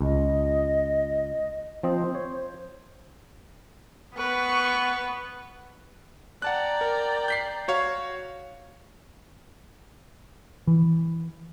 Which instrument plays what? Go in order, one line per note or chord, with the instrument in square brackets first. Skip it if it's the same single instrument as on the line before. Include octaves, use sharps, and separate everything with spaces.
[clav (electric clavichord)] C#2 [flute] D#5
[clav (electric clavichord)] F3 C4 D#5 [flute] C5
[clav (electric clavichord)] C#5
[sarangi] B3 [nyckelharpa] B4 [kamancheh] C#6
[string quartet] D5 G5 A#5 [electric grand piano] F#5 A5 F#6
[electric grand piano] A#4
G6 B6 C7
F#4 C#5 F5
[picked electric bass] E3